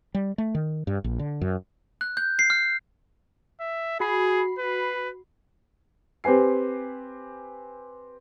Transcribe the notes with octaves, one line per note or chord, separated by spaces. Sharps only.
G3
A3
D#3
G2
A#1
D3
F#2
F#6
G6
C7
F6
E5
F#4 G#4 B5 C7
B4
C4 G4 B4 G#5 C7